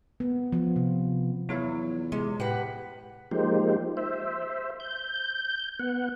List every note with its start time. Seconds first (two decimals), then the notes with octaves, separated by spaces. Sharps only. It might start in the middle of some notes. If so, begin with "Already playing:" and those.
0.20 B3
0.53 F3
0.76 C3
1.49 E2 F#3 E4 F4 C#5
2.12 C3 G#3
2.40 A2 G4 B4 F#5
3.31 F3 G#3 A#3 D#4 G4 C5
3.97 C5 E5
4.80 G6
5.79 B3 F#5